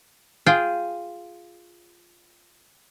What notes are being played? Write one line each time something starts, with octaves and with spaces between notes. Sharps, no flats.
F4 G#4 G5